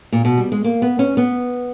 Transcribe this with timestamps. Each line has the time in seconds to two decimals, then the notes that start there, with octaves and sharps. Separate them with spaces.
0.12 A#2
0.25 B2
0.38 G3
0.52 G#3
0.64 A#3
0.82 B3
0.99 C#4
1.17 B3